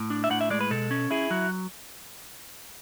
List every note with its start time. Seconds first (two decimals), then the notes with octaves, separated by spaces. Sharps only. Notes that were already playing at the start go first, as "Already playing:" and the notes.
Already playing: A2
0.10 D4
0.24 E5
0.30 A2 F#5
0.41 E5
0.50 G#3 D5
0.61 B4
0.71 B2 A4
0.91 C#4
1.11 E4 G#4
1.31 F#3 F#4